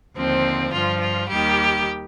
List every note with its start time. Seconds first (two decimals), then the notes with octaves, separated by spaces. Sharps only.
0.16 D#2 D3 F3 C4
0.72 G2 F3 F4
1.01 F4
1.29 D#2 D#3 G3 G4